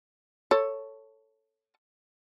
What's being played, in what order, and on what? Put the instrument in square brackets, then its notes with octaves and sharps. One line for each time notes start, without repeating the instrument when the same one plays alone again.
[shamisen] A4 C#5